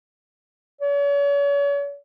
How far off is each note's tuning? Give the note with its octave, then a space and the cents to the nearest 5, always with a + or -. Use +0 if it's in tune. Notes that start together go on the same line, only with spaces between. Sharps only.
C#5 +40